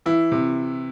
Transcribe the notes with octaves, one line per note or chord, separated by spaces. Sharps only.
E3 E4
C3